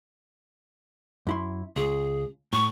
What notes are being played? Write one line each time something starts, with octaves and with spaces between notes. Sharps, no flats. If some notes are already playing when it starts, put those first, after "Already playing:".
F#2 E4 C6
C#2 G#4
A2 C#6